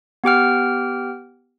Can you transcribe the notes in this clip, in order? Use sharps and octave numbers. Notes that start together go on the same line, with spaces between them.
B3 G4 G5 F6